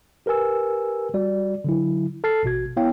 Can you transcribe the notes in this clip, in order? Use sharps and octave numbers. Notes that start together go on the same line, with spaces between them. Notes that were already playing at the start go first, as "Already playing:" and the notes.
G4 A#4 B4 G#5 E6
G3 F#4 D5
D3 F#3 E4
A4 A5 F6 A6 C7
A1 B2 F#4 G#6
B3 E4 C#5 F5 G5